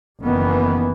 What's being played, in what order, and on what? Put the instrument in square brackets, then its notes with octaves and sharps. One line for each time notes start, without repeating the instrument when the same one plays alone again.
[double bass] F#1 E3 [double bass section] D#3 B3